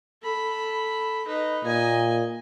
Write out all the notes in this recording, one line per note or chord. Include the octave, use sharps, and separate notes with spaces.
A4 B5
D#4 B4
A#2 D#5 G#5